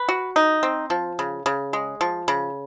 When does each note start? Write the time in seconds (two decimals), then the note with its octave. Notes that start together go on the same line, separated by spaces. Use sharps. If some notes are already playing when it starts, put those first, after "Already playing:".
Already playing: B4
0.09 F#4
0.36 D#4
0.63 C4
0.90 F3
1.19 C#3
1.46 C#3
1.73 G#3
2.01 F3
2.28 C#3